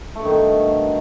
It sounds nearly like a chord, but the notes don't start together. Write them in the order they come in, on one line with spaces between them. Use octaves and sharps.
A3 G2 D#3 B2